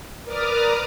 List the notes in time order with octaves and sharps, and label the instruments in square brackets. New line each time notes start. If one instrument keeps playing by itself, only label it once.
[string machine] A#4 B4 D5 D6 D#6 F6